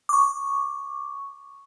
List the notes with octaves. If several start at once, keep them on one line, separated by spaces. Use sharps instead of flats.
C#6 D6